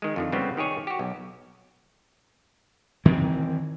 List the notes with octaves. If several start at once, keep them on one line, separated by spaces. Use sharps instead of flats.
D#3 G#3
F2 D3 D#3
C#3 G3 A3 B3 C4
D#3 G4 G#4 C#5
F#4 G4
B1
D#3 E3 C4